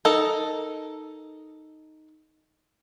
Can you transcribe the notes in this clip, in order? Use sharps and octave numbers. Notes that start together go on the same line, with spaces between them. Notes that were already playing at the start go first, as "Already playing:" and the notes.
D#4 A4 A#4